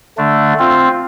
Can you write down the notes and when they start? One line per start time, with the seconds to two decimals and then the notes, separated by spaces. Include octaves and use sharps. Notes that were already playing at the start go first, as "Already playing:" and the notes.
0.18 D3 A3 D4
0.59 C4 F4